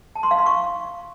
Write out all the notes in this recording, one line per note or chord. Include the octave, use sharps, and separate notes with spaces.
A5
C6
F5
C6
C#6